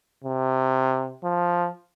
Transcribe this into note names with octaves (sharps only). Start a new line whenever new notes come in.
C3
F3